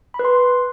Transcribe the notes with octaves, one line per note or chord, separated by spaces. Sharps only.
B5
B4
C6